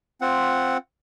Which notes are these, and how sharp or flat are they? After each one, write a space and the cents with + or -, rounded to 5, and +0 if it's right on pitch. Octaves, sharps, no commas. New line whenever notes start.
C4 +0 F4 +0 F#5 +0